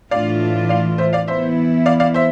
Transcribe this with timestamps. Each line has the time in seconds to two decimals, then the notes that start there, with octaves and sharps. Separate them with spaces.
0.11 A2 E3 A3 D4 F4 D5 F5
0.69 D5 F5
0.98 C5 E5
1.13 D5 F5
1.27 E3 B3 E4 C5 E5
1.86 D5 F5
2.00 D5 F5
2.14 C5 E5